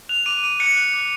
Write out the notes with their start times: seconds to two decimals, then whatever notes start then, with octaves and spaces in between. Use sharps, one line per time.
0.09 F#6 F7
0.26 D6 D#7
0.43 D6 D#7
0.60 F#6 C#7
0.76 F#6
0.94 D6